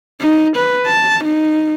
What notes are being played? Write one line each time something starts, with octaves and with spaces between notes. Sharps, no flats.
D#4
B4
A5
D#4